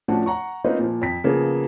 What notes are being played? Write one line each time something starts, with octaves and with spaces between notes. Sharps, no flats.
A2 F3 A3 C#4 D4 F#4
F#5 A#5 C#6
A#3 C4 C#4 D#4 F4 B4
A#2 F3
F2 B6
C#3 F3 A#3 B3 G#4